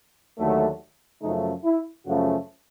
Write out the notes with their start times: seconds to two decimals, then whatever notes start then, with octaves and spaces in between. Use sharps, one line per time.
0.38 D#2 D3 F#3 A3
1.22 F#2 C#3 F3 A3 D#4
1.65 E4
2.07 F#2 C#3 F3 A3 F#4